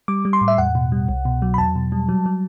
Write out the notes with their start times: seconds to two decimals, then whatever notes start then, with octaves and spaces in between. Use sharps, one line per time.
0.08 G3 D6
0.25 G3
0.33 C6
0.41 A2
0.48 E5
0.58 E2 F#5
0.75 B2
0.92 G3
1.09 C2
1.25 B2
1.42 F#3
1.54 B5
1.58 E2 A5
1.76 B2
1.92 G3
2.09 F#3
2.26 F#3